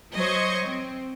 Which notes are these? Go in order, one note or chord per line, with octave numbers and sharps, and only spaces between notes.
F#3 C5 D#5 C#6 G#6
C4